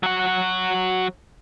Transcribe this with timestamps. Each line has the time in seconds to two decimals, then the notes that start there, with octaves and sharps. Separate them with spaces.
0.03 F#3 F#4